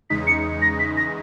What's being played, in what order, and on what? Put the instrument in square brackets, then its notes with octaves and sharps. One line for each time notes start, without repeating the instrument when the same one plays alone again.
[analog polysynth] E2 C#3 G#3 D#4 [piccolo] B6
[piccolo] C#7
A#6
[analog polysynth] E2 C#3 G#3 D#4 [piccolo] B6
[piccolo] A#6